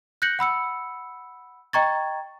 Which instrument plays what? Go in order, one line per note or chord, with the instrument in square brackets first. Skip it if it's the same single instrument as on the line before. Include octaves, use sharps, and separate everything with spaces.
[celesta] F#6 G6 A#6 C#7 F#7
F#5 B5 E6 C#7
D#5 G5 A#5 C#6 G#6 A6